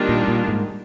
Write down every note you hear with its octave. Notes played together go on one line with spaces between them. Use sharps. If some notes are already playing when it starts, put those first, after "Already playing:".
Already playing: D#3 G3 A#3 D4 F4
A#2
A#2
G#2